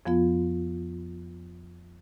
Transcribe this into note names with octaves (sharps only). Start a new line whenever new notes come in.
F2 F3 B3 F4